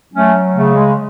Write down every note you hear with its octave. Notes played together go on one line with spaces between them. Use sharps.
F#3 A3 C#4
C#3 A3
G#3